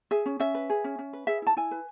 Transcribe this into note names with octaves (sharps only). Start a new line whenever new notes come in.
G#4 E5
C#4
C#4 E5
B4
G#4
C#4
C#4
B4
G#4 E5
E4 A5
E4 G#5
B4